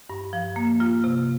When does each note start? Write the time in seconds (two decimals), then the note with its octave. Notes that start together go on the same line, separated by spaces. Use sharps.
0.10 G2
0.33 F3
0.56 A#3
0.80 F4
1.04 C3